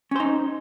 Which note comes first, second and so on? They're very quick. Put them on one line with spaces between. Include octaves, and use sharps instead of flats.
C#4 C5 D#4